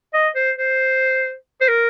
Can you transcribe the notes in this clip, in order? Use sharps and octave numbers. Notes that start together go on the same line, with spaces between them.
D#5
C5
C5
C5
A#4